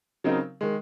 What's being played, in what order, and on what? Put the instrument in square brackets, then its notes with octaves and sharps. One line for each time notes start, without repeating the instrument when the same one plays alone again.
[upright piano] C#3 F#3 C4 D#4 A#4
D#3 G#3